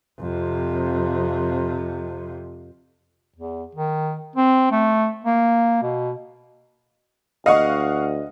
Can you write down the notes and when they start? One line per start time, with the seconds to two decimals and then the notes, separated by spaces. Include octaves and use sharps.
0.21 F2 C3
3.36 E2
3.75 D#3
4.36 C4
4.71 A3
5.24 A#3
5.83 B2
7.46 D2 D#5 F5 F#5 C#6